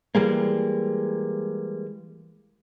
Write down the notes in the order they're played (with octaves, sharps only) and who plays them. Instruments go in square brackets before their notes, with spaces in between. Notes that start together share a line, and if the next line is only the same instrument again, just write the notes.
[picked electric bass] E3 G3 G#3 A#3